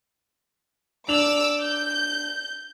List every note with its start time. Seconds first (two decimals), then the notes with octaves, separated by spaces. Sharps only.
1.08 D4 D6 E6 F7 F#7
1.61 G6